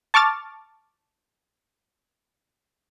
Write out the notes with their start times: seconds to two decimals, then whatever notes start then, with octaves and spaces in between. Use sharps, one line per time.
0.14 A5 C#6 D6 F6 A6